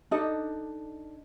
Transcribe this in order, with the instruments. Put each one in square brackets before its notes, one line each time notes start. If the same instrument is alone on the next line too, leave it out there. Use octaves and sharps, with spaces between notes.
[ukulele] D4 D#4 A4 D#5